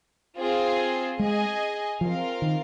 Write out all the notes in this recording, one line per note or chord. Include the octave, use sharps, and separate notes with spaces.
C4 F4 G#4
G#3 G#4 D#5 G#5
F3 C4 F4 A#4 F5
D#3